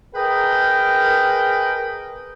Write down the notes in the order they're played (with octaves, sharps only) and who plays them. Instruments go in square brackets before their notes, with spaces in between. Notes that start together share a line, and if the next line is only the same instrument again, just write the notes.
[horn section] G#4 A#4 B4 D#5 G5